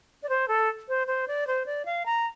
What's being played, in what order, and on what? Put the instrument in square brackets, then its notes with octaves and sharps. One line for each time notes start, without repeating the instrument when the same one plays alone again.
[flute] D5
C5
A4
C5
C5
D5
C5
D5
F5
A#5